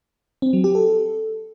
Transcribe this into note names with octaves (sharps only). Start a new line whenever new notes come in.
C4
F#3
G4
A4